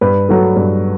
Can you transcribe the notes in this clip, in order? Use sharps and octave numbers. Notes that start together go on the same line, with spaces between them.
G2 B4
F#3 A3
G2